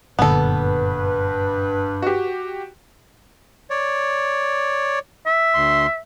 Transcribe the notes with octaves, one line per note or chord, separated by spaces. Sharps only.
F#1 G2 A#2 D3 B3 A4 B4
F#4 G4
C#5 D5
E5
D2 C6